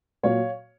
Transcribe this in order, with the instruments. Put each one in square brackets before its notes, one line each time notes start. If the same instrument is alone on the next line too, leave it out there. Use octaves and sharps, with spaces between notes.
[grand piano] A#2 F#3 C#5 F5